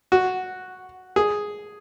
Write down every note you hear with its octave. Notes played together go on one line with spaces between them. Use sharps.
F#4
G#4